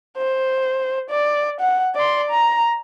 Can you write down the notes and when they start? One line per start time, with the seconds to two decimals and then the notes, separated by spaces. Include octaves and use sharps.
0.17 C5
1.10 D5
1.60 F#5
1.95 D5 C6
2.31 A#5